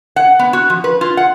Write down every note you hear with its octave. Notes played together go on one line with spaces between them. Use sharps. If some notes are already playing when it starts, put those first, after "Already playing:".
F#5
B3
F#4
F3
B4
F4
F#5